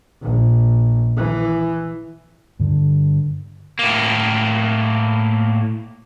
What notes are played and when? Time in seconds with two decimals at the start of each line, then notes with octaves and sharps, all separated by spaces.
0.22 A#1
1.17 E3
2.60 G2 D3
3.79 A2 A#3